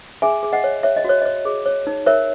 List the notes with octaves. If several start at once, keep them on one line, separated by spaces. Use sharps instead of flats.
G#4 E5 G#5
G#4
D#5 F#5
C#5
C#5 E5
D#5
F#4 C#5
C#5 D#5
G#4
C#5
D#4
A#4 C#5 E5